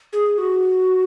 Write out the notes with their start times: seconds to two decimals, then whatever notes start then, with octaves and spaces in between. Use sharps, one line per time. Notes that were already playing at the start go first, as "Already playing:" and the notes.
0.13 G#4
0.38 F#4